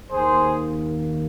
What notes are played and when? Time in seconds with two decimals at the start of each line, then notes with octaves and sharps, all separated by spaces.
0.11 D#2 D#3 A#3 G#4 C5